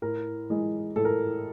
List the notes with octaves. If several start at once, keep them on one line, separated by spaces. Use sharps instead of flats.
A2 A#4
E3 G#3
A2 A4
A#4